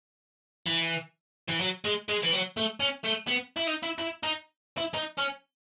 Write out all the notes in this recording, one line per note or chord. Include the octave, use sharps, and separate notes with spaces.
E3
E3
F#3
G#3
G#3
E3
F#3
A3
C#4
A3
B3
E4
D#4
E4
E4
D#4
E4
D#4
C#4